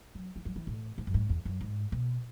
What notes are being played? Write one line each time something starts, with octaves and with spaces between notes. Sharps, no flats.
F#3
E3
F#3
E3
A2
G#2
F#2
G#2
E2
F#2
G#2
B2